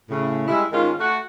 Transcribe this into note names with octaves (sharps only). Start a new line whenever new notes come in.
A2 C#3
G3 G#3 E4
G#2 D#3 G#3 C#4 F4 F5
A3 F#4